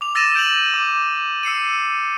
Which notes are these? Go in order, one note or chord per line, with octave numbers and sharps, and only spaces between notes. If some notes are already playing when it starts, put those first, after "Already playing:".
D6 F7
E6 A6 A#6 D#7 E7
G6 D7 D#7 F7 F#7
D6
E6 C7 C#7 D#7